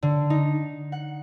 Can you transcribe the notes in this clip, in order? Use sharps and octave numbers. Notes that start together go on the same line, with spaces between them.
D3
D#4
F#5